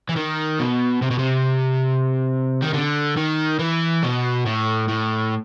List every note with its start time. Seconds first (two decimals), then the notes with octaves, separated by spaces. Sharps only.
0.09 E3
0.16 D#3
0.59 B2
1.02 C3
1.11 B2
1.19 C3
2.63 D#3
2.74 D3
3.16 D#3
3.59 E3
4.03 B2
4.46 A2
4.89 A2